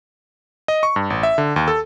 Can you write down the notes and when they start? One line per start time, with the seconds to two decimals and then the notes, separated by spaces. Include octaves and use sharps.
0.68 D#5
0.83 C#6
0.96 G2
1.10 A1
1.23 E5
1.38 D3
1.56 D#2
1.68 A4